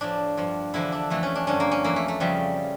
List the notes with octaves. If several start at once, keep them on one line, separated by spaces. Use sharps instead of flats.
A2 F3 D4
G2 F3
E2 D3 F3 E4
D4
F2 E3 A3
C#4
D4
G2 D3 F3 C#4
A#3
C#4
F2 E3 A#3
A3
A3
F2 C#3 F3 G3